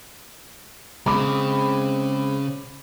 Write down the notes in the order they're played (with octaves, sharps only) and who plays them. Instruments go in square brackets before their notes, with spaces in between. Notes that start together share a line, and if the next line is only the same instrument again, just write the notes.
[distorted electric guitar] C#3 [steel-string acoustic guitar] G#3 C4 [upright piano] B5 D6